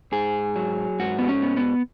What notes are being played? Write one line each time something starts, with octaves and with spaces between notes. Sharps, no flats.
G#2 G#4
F#3
G#2 F#4
B3
C#4
B3
B3